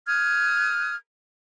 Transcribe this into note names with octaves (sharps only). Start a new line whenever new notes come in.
D#6 F6 F#6 G#6